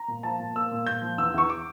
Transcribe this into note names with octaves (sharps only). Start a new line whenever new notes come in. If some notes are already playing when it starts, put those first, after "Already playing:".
Already playing: A#5
A#2
F3 A5
A#2
A#3 E6
A#2
A#2 G6
F3
E2 E6
E2 C#6
D6